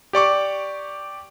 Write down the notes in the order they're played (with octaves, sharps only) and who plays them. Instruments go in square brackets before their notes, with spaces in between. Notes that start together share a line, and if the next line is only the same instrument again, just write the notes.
[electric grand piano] G4 D5 C#6 D6